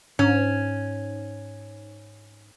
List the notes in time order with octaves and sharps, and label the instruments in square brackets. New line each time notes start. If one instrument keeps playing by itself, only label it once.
[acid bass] G#2 [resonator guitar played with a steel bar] C#4